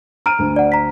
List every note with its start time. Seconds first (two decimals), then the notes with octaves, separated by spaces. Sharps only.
0.26 A#5 F6 D7 D#7
0.39 D2
0.56 D5 F#5
0.72 A#5 B6